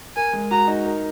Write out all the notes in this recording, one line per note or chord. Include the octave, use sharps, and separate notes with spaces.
A#4 G#5
G#3
F#4 A#5
D#4
A#4